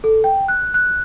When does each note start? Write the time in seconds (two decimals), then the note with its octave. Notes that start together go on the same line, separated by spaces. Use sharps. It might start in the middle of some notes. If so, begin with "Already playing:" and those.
0.04 A4
0.24 G5
0.48 F#6
0.74 F#6